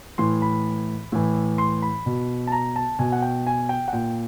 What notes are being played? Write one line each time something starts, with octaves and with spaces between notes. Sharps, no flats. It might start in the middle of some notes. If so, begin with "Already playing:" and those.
A2 E3 C6
B5
A2 E3
C6
B5
B2
A5
A#5
A5
B2 G#5
F#5
G5
G#5
G5
F#5
A#2 G5